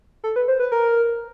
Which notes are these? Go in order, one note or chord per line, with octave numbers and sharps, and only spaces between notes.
A4
B4
C5
B4
A#4